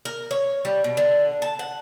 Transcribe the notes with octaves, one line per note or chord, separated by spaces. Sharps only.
A#4
C#5
G3
B2
D3
A5
F#5